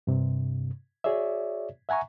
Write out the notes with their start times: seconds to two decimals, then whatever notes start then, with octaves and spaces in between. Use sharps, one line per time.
0.07 G2 C3
1.04 F#4 G#4 C#5 D5 E5
1.89 E5 F#5 G#5 A#5 C#6